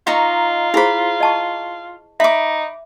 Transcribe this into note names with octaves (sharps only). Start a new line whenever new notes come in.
D#4 F4 A#5 C#6
E4 G#4 C5 A#5 B5
D#5 A5 C#6
D#4 E5 B5 D6